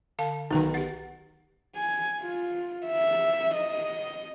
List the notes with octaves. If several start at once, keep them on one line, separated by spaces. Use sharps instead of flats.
D3 F5 A5
B1 D#3 D#4 B4
G4 F#5 A6
G#5
F4
E5
D#5